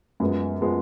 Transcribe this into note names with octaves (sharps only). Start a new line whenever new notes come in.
F#2 F3 G#3 B3
F3 G#3 B3